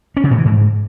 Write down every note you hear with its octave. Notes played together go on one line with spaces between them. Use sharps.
C#4
C#3
A2
E3
G#2